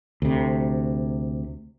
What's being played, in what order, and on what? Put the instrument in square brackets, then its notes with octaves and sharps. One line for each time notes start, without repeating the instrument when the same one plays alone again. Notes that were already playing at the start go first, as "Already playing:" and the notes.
[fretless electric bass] D2 C3